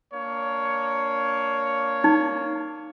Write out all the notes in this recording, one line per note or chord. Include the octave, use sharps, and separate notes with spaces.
A#3 D4 C#5
D#4